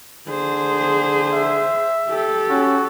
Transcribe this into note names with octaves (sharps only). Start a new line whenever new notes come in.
D3 G#4 C5
E5
G4 A4
C#4 F#4